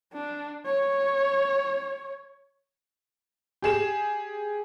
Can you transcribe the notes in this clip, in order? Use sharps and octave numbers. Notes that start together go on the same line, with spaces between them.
D4
C#5
G4 G#4 E7